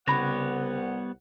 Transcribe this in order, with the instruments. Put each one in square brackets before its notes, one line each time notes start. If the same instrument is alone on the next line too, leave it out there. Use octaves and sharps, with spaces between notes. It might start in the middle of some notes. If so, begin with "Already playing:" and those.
[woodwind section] C2 F#5 [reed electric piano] C#3 [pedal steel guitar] G3 B3 C#5 [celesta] B5 A#6